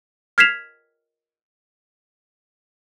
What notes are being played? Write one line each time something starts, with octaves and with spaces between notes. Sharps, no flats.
F6 G#6 B6 C7 E7 F7